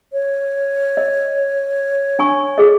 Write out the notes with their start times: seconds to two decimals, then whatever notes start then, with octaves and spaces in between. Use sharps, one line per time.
0.13 C#5
0.97 D#5
2.19 D4 G#5 C#6
2.58 G#4 A4 D#5